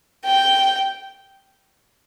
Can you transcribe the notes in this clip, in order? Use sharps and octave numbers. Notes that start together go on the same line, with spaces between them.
G5